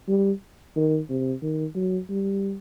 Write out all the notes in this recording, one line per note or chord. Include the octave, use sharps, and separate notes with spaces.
G3
D#3
C3
D#3
F#3
G3